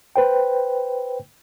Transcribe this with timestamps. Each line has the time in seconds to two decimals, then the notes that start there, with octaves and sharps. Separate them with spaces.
0.16 B4 C5 G5